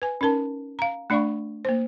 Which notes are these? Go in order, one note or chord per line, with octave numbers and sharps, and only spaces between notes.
B4 G#5
C#4 D#4 A#4 A5
F5 A#5
A3 D4 D5 F5 B5 C#6
A#3 C5